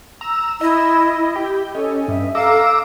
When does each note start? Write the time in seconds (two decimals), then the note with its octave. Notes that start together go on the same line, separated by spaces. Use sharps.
0.21 A#5 E6
0.61 E4 D#5
1.36 G4 G5
1.75 C#4 A4 D#5
2.08 G2 E5
2.35 A4 F5 A#5 D6 E6